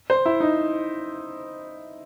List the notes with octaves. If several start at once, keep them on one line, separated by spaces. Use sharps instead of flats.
C5
E4
D#4